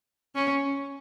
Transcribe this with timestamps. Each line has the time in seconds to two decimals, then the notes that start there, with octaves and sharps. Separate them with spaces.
0.35 C#4